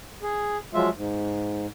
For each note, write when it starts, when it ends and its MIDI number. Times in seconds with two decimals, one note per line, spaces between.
0.23 0.57 68
0.74 0.89 53
0.74 0.89 54
0.74 0.89 56
0.74 0.89 65
0.74 0.89 76
0.96 1.67 44